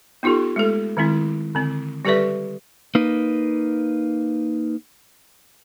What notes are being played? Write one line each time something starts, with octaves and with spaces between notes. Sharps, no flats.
B3 D#4 F4 G4 A4
G#3 A3 A4
D#3 G#3 C4 E4
D3 C4
G3 G4 A4 B4 D5 E5
A#3 D#4 B4